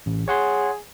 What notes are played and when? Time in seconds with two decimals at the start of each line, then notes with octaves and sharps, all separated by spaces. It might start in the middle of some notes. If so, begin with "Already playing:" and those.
0.06 A1
0.28 G#4 C#5 F#5 C6